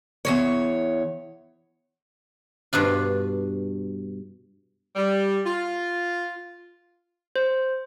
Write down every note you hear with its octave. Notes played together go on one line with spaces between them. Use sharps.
E2 C#3 C#5
G2 B2 D4 F4
G3
F4
C5